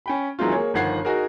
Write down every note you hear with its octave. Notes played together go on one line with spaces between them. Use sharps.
C#4 G5 B5
D#3 E3 F#3 G#3 C4 F4
A#3 G#4 C#5
G1 D#3 F3 F#5 G#6 C7
D#4 F#4 G#4 A#4